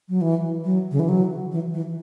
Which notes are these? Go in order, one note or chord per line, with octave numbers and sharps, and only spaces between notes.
F#3
E3
F#3
C#3
E3
F#3
E3
E3